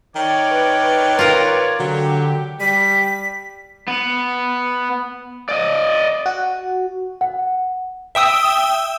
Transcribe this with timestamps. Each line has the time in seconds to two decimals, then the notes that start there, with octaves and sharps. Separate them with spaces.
0.15 D#3 C#5 D5
0.51 B4
1.19 F4 A#4
1.79 D3 F#3 G4
2.60 G3 B6
3.88 B3
5.49 D5 D#5
6.26 F#4
7.21 F#5
8.15 E5 G5 D#6 E6